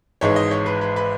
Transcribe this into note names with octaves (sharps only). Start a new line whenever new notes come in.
G#1 G#2 E3 G#3 C#5
D#5
C#5
B4
B4
B4